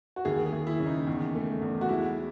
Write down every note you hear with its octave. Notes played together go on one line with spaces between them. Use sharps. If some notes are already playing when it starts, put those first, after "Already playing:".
F#4
D#2 G#4
G#4
D#2
E4
C#3
D#4
E2
A3
E2
F#4
G#3 E4